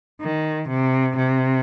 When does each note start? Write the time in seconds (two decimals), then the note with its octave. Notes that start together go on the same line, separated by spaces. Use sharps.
0.21 D#3
0.69 C3
1.17 C3